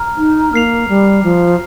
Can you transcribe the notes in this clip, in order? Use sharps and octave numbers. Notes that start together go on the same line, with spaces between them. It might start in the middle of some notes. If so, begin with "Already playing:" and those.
Already playing: A#5 F6
D#4
A#3 F6 C7 F7
G3
F3